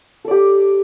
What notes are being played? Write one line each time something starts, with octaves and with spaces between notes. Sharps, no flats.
G4 A4 D5